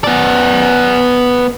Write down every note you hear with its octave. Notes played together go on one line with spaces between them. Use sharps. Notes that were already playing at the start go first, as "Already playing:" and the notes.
B3 D5